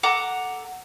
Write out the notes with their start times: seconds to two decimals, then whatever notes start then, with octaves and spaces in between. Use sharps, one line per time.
0.03 A4 F#5 A#5 D6